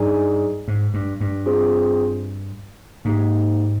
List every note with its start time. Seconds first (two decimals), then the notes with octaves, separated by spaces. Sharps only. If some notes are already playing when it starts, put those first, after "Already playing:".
Already playing: G2 D#4 G#4 D5 G#5
0.68 G#2
0.94 G2
1.21 G2
1.46 C4 F4 G#4 C5
3.05 G#2 A#3 D#4 G4